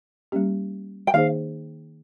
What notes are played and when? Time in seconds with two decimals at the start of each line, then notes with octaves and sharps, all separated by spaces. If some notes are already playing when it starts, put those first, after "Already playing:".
0.32 G3 A#3 C#4 G4
1.07 G5
1.14 D#3 A#3 D#4 G#4 C5 F5